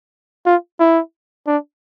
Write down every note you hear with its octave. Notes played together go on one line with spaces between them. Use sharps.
F4
E4
D4